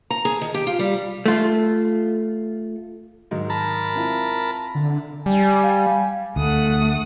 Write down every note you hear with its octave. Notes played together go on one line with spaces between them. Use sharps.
A#5
G#4
D#3
G4
F4
G3
A3 F4
G#2 D#3 F#3
A#4 A5 B5
C4 E4 F4
D3
G3 G#5
F5
D2 A3 F#5 D#6